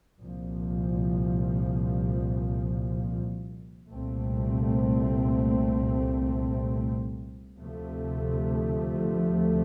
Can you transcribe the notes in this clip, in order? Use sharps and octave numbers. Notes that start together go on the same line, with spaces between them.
C2 A#2 F3
C2 A#2 A3 C4
D2 C3 F3 A3